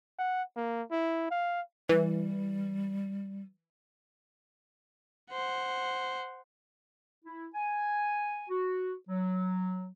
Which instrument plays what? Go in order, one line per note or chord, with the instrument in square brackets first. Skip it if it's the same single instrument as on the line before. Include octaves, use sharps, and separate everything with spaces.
[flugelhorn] F#5
A#3
E4
F5
[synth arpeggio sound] E3 [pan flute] G3
[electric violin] C5 F#5
[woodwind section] E4
G#5
F#4
F#3